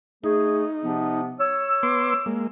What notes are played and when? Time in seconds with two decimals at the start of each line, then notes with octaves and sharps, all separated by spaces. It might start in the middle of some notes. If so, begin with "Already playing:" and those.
0.24 A3 D#4 G#4
0.84 C3 F3 B3
1.39 C#5 E6
1.83 B3 C6 D6
2.26 G#3 A#3